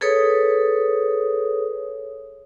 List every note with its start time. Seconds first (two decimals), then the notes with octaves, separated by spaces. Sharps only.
0.01 G#4 A4 B4 C#5 D#6